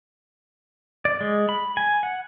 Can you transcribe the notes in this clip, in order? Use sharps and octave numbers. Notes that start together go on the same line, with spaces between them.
D5
G#3
B5
G#5
F#5